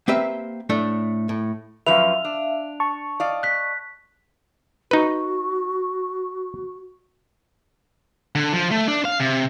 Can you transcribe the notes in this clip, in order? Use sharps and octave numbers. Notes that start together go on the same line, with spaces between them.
A#3 C4 G4 B4 E5
A2 A3 D4
A2
F#2 F3 B4 E5 F5 F7
D4
A5 C#6
D5 D#5 F5
F#6 B6
D#4 F#4 B4
D3
F3
A3
D4
F5
C3